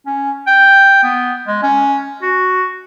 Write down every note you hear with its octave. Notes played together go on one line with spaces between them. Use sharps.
C#4
G5
B3
G#3
C#4
F#4